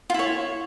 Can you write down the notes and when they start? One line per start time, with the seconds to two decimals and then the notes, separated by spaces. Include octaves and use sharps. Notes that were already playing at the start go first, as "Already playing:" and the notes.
0.10 F4
0.14 E4
0.19 C#5